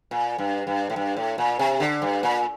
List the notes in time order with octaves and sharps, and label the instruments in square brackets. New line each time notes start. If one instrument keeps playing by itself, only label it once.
[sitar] A#2
G2
G2
A2
G2
A2
A#2
C3
D3
G2
A#2